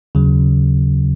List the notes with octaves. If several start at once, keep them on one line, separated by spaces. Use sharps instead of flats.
D#2 C#3 F#3